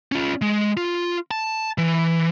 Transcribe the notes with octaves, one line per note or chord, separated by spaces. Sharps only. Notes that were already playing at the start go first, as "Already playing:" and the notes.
C#4 F4
G#3
F4
A5
E3